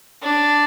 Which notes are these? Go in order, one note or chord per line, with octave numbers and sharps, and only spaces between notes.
D4